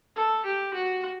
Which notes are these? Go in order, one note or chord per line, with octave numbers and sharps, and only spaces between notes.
A4
G4
F#4